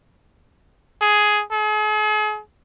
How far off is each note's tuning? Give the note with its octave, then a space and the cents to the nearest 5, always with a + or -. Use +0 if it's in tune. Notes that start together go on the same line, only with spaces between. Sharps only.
G#4 +10
G#4 +40